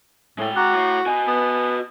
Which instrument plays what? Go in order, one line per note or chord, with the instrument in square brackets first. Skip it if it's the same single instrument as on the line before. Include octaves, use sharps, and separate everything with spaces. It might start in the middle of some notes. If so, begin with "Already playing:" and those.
[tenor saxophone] A2 [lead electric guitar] G#3 G5
[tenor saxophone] F#4 [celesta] A#5 D6 F#6
[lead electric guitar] A2
[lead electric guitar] F#4 D#5 [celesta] G#5
[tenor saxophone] B3